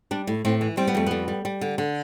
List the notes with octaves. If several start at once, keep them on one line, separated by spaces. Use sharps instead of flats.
G3 D4
A2
A2 C4
E3
G3 C4
B3
F2 A3
G3 B3
G3
G3
D3
D3